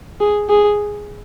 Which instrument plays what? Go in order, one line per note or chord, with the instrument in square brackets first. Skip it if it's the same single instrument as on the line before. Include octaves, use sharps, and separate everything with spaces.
[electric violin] G#4
G#4